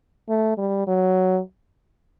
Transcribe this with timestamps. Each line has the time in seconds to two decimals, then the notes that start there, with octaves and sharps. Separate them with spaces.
0.29 A3
0.58 G3
0.87 F#3